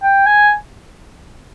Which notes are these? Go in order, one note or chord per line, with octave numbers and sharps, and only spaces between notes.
G5
G#5